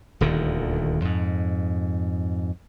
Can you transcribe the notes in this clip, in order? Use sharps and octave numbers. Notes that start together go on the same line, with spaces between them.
D#1 D2 D3 D#3
F2 G#2